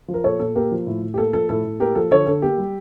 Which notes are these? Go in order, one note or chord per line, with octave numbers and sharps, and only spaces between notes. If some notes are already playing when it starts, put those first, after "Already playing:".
F3
A#4
A#2 A4 C#5
A#2 A4
A#3 G4 A#4
F3
A2
A2
G4
A#3 A4
F3 A4
A2 A4
A2
A#3 G4 A#4
F3 A4
D3 A4 C#5
D3 A4
A#3 G4
G3